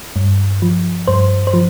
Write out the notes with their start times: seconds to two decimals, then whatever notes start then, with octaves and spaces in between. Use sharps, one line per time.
0.16 G2
0.62 F3
1.07 G2 C5
1.47 C5
1.54 F3